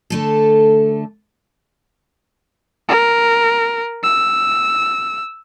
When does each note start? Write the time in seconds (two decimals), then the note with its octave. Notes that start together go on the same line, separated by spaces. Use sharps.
0.10 D3 A3 A4
2.89 A#4
4.03 E6